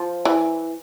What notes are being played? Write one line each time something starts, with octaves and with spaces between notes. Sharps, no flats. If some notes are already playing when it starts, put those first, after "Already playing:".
Already playing: F3
E3